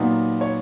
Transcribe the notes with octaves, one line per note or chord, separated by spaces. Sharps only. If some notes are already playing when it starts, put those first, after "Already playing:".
Already playing: A#2 F#3 B3 D#4
C#5